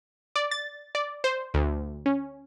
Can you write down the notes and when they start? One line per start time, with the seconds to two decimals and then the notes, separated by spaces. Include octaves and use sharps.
0.36 D5
0.51 A6
0.95 D5
1.24 C5
1.54 D2
2.06 C#4